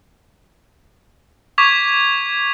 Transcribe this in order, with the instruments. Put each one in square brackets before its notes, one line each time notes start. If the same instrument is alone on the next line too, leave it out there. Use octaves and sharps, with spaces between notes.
[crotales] C#6 D6 G#6 B6 F7